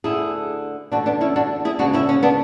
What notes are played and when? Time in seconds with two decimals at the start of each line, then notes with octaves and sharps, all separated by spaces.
0.04 D2 D3 A3 E4 G#4
0.92 E2 D3 A3 D4 F#4
1.06 B3 D4
1.21 C#4 E4
1.36 D4 F#4
1.65 E4 G#4
1.79 D2 C#3 G#3 D4 F#4
1.94 C#4 E4
2.09 C#4
2.23 B3 D4